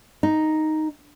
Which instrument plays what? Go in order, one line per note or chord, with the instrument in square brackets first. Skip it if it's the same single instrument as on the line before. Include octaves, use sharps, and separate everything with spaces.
[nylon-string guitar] D#4